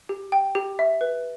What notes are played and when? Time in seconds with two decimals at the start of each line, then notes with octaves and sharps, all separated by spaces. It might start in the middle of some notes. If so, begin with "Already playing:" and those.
0.09 G4
0.32 G5
0.55 G4
0.79 E5
1.01 B4